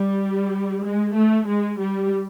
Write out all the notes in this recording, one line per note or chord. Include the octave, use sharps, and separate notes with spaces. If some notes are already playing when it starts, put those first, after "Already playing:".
Already playing: G3
G#3
A3
G#3
G3